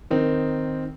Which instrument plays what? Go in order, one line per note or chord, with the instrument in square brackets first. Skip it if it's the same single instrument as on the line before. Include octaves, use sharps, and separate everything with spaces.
[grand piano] D#3 C4 D#4